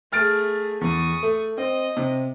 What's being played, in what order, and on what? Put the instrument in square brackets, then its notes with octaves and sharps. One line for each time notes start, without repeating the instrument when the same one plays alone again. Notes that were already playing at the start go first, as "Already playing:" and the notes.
[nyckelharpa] A3 G#4 [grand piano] F6 A6 D7
[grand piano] E2 [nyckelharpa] C#6 D#6
[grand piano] A3
[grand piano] C4 [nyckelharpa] D#5
[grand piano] C3